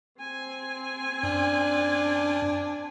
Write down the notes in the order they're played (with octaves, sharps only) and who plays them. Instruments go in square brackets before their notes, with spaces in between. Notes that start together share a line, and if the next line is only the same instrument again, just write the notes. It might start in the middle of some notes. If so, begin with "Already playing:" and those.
[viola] C4 G#5
[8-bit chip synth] F#2 [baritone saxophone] D4